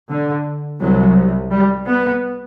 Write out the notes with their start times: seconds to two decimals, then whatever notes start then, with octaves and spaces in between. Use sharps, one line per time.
0.10 D3
0.81 C2 C3 F#3
1.52 G3
1.87 B3